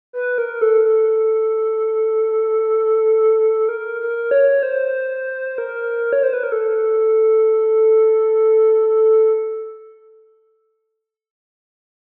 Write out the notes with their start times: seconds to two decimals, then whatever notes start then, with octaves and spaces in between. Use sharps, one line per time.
0.13 B4
0.38 A#4
0.62 A4
0.85 A4
3.69 A#4
4.01 A#4
4.31 C#5
4.63 C5
5.58 A#4
6.13 C#5
6.23 C5
6.33 B4
6.43 A#4
6.52 A4